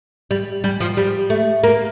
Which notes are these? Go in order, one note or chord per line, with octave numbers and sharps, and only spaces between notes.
G3
G3
F3
G3
A3
A#3